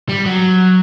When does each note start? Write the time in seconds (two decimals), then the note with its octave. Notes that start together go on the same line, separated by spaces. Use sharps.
0.09 G3
0.26 F#3